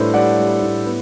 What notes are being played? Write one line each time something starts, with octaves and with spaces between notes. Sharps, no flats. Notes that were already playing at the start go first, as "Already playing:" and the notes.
Already playing: A2 G3 D4 A4 B4 C5
G3 D5 F#5
G3
A2
B3